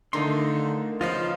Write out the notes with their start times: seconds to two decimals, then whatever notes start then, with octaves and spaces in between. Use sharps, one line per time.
0.13 D3 D#3 A3 D#4 F4 A#4 C6
1.01 C#3 F3 A#3 B3 F4 D#5 F5